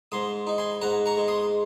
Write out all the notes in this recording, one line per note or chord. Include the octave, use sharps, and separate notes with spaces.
G#2 C6 D#6
D#4
G#5 C6
G#2 F#5 A#5
A#5 C#6
G#3
C6 D#6